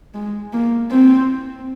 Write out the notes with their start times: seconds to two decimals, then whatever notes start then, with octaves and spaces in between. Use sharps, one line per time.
0.14 G#3
0.53 A#3
0.91 C4